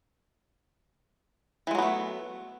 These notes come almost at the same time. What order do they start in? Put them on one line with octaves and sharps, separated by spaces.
E3 G#3 F#3 B3 A3